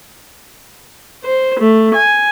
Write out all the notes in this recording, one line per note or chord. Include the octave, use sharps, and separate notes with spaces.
C5
A3
G#5